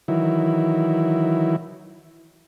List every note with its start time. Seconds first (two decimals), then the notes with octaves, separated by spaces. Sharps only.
0.08 D#3 E3 F#3 E4